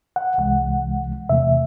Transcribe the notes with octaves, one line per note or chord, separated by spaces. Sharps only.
F#5
C2 C3 E3 G#3 F#5
E2 C3 E3 A3 E5